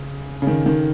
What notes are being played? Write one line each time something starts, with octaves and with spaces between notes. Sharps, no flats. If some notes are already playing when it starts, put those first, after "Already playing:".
Already playing: C#3
C#3
D#3
D#3